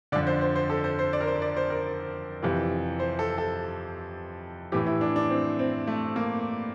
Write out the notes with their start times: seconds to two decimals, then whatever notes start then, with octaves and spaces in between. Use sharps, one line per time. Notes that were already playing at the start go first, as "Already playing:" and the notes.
0.12 D3 D5
0.16 F2
0.27 C5
0.41 C5
0.55 C5
0.70 A4
0.84 C5
0.99 C5
1.13 D5
1.21 A#4
1.27 C5
1.42 D5
1.57 C5
1.70 A#4
2.43 F2 C3 E3
2.99 C5
3.19 A4
3.38 A4
4.72 A2 E3 G4
4.87 E4
5.01 D4
5.16 D4
5.30 C4
5.59 C4
5.87 A3
6.16 A#3